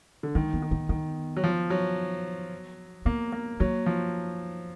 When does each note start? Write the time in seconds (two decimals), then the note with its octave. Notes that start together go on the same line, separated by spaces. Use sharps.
0.23 D3
0.35 D#3 G#3
0.53 B3
0.62 D#3
0.71 B3
0.89 D#3 B3
1.37 F#3
1.44 F3
1.70 F#3
3.05 A#3 B3
3.32 A#3
3.60 F#3 A#3
3.86 F3